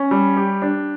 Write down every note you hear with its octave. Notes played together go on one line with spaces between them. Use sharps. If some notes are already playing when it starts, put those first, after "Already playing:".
Already playing: C#4
G3
G4
D4